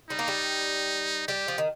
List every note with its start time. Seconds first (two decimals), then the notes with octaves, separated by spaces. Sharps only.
0.10 G3 D#4
0.19 A#3
0.28 G3
1.28 G3 G4
1.48 F3
1.58 D#3